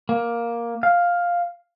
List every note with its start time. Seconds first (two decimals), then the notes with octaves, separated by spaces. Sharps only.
0.09 A#3
0.83 F5